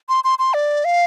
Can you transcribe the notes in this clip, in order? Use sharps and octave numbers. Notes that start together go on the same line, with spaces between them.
C6
C6
C6
D5
F5